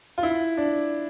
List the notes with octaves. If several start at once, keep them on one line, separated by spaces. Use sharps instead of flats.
F4
E4
D4